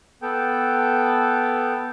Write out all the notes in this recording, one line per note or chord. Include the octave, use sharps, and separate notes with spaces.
B3 A4 G5